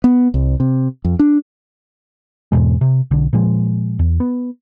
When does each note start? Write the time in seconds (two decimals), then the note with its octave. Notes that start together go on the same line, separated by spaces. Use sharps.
0.04 B3
0.34 C2
0.60 C3
1.05 F2
1.19 D4
2.52 E2 G#2 B2 G#3
2.81 C3
3.11 B1 D3
3.33 A#2 F3 G#3
3.99 E2
4.20 B3